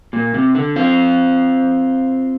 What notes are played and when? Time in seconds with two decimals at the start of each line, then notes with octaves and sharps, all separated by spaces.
0.13 A#2
0.34 C3
0.55 D3
0.76 C4 F4